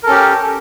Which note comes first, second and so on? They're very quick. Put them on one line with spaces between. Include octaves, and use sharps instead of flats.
A#4 A4 C#4 G4